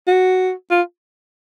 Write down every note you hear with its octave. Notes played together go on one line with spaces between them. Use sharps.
F#4
F4